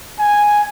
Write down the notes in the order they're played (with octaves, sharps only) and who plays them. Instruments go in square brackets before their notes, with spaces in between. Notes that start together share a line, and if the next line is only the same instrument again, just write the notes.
[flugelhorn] G#5